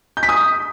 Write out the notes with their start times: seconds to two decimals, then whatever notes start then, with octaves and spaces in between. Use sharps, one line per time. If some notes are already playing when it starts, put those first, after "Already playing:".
0.17 G6
0.23 B6
0.29 D#6